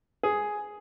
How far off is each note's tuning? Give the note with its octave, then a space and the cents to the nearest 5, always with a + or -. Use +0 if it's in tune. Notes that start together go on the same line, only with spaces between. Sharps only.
G#4 +5